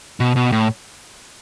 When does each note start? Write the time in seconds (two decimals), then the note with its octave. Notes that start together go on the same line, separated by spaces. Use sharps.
0.20 B2
0.36 B2
0.52 A2